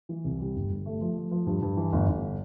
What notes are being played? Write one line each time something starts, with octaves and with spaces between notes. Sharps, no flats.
E3
C2
G3
G1
G1
A3
F3
A3
F3
G2
G2
E3
G1
G1